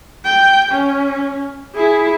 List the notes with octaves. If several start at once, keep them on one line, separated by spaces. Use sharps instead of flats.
G5
C#4
E4 G#4